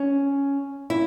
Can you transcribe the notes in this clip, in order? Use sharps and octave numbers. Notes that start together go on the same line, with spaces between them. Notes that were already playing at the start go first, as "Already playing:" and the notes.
Already playing: C#4
E4